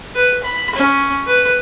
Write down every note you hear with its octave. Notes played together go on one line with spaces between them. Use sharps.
B4
B5
C#4
B4